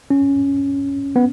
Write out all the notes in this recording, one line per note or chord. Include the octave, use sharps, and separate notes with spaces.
C#4
B3